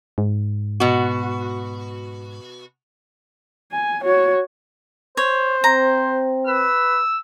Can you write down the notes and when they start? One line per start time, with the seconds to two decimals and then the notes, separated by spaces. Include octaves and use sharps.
0.18 G#2
0.80 B2 F#4
3.72 G#5
4.04 F#4 C#5
5.17 C5 C#5
5.64 C4 A#5
6.47 B4 E6